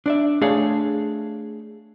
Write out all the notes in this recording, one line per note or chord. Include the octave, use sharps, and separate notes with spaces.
D4 D5 E5
A3 D4 G#4 C#5 F5